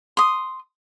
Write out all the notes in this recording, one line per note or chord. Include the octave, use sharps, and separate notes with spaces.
C6 D#6